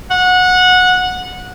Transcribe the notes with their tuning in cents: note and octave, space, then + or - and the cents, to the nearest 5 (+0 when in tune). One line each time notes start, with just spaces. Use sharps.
F#5 -20